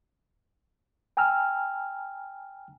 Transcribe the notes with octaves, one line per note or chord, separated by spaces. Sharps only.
G5 G#5 A#5 E6 F6